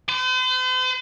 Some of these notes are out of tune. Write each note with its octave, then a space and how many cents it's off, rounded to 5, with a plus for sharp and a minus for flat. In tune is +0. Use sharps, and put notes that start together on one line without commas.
C5 -45